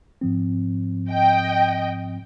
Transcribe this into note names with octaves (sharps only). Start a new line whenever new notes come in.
G#2 F3 C4
D#5 G5